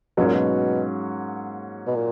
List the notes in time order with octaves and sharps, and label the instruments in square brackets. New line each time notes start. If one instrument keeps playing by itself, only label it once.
[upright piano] G#2 F#3 A#3 C#4 [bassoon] B2
[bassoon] A#2
B2
B2
A#2